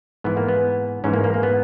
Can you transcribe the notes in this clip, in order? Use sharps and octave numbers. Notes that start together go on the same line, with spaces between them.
G#2 E3 B3
A#3
B3
G#2 E3 C#4
A#3
A#3
A#3
B3